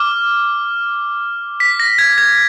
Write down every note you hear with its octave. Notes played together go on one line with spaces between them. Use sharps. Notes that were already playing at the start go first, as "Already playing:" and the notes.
Already playing: D6 F6
B6
A#6
G#6
G#6